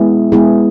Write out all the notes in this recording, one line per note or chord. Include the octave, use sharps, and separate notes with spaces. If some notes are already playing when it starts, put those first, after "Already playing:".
Already playing: G#3 B3 E4 G#4
G#3 B3 E4 G#4